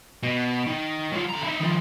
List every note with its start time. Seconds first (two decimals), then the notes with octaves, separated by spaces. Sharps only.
0.23 B2
0.67 D#3
1.12 F#3 F4
1.29 D3 A#5
1.43 D#4 E4
1.60 D#3 F3